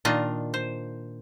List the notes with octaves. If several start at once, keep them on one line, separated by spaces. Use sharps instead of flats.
A#2 D#3 D4 F4 D#5
C5